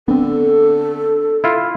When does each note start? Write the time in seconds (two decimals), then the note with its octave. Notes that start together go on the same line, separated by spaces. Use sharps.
0.08 D3 B3 C4 A4
1.44 E4 F4